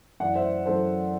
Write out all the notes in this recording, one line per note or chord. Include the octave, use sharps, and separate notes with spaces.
F#2 E3 D5 F#5
C5 E5
F#2 E3 A4 C5